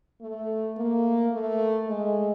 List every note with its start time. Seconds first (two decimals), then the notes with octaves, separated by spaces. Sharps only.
0.21 A3
0.77 A#3
1.32 A3
1.88 G#3